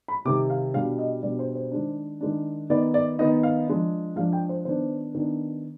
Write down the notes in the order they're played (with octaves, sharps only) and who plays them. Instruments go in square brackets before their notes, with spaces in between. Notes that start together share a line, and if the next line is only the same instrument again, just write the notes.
[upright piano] B5
C3 D#3 G3 D6
F5
B2 G3 D4 F5
D#5
B2 G3 D4 D5
C5
C5
D#3 G#3 D4
D#3 G#3 D4
D#3 B3 D#4 D5
D5
D#3 B3 D#4 D#5
F5
F3 G#3 D4
F3 G#3 D4 F5
G5
C5
D#3 B3 D4 C5
D#3 B3 D4